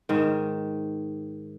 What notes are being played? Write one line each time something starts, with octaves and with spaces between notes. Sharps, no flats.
G#2 D#3